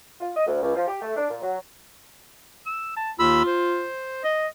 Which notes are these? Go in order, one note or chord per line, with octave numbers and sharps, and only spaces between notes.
F4
D#5
D2
C#2
F3
G4
A3
D4
A#2
F#3
E6
A5
D#2 F4 B5 E6
C5
D#5